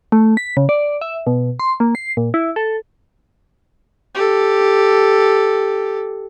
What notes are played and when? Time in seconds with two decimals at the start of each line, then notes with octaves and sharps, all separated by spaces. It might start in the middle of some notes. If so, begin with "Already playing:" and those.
0.12 A3
0.37 B6
0.57 C#3
0.69 D5
1.01 E5
1.27 B2
1.60 C6
1.80 A#3
1.95 C7
2.17 A#2
2.34 E4
2.56 A4
4.15 G4 A4